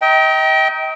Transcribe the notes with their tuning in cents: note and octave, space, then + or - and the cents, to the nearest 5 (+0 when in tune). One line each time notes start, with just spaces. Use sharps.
D#5 +40 G5 -10 A#5 +0